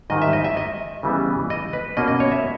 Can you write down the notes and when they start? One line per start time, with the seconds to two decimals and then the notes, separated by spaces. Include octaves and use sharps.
0.10 G#2 D#3 G3 D#5
0.22 E5
0.33 D#5
0.44 E5
0.57 D#5
1.03 C#3 E3 G3 B3
1.50 D#5
1.73 B4
1.97 B2 A#3 C#4 D#5
2.08 D#5
2.20 C#5
2.31 E5